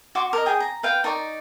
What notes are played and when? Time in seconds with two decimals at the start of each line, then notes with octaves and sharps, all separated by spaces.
0.15 F#4 C6 D6
0.33 A#4 D#5
0.46 G#4 G5 D#6
0.60 A#5
0.83 B4 F5 G5
1.04 D#4 A#4 D5 C#6